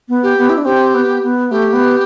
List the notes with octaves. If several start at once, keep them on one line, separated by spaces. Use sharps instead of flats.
B3
G4
B3
E4
D4
C4 G4
B3
B3
A3 G4
B3